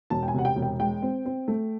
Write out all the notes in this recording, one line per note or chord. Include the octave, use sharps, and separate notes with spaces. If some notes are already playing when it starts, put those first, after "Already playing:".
E1 A5
G5
G#5
C3 F#5
G5
E1
G5
G#3 G5
C4
C4
A3